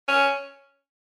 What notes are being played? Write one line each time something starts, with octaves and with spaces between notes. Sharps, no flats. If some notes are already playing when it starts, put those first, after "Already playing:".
C#4